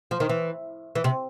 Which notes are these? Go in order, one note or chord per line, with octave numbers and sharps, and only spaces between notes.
F3
D#3
E3
E3
C3